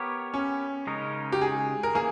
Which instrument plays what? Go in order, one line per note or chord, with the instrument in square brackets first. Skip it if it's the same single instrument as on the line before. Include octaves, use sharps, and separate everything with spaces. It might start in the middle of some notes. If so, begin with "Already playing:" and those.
Already playing: [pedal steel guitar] B3 G4 A#4 C#5
[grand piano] C#4
[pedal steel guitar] C#3 G#3 D#4 A#4 C#5
[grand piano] G4
G#4
A#4
[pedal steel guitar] E3 A#3 [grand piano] G#4